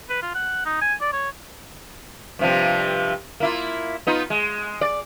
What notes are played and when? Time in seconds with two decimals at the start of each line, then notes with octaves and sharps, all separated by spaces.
0.09 B4
0.22 F4
0.35 F#5
0.65 D#4
0.81 G#5
1.01 D5
1.13 C#5
2.39 G2 C3 F3
3.40 A#3 E4 F4
4.07 B3 D#4 F4
4.30 G#3
4.81 D5